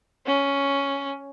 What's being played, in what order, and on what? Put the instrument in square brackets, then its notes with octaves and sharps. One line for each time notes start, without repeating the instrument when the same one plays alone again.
[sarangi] C#4